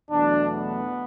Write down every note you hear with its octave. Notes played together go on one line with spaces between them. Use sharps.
E2 B2 F#3 A3 D4
B3